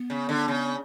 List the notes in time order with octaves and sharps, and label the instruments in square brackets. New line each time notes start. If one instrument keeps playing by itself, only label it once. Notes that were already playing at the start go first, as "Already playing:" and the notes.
Already playing: [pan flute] B3
[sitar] C#3
D3
C#3